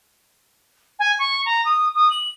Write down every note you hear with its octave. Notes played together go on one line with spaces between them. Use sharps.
G#5
C#6
A#5
D#6
D#6
F#7